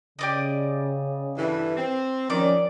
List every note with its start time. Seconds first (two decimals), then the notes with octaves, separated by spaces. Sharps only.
0.19 C#3 G4 D5 D#5
1.38 G2 D3 E3
1.77 C4
2.30 D#3 F3 C#4 D5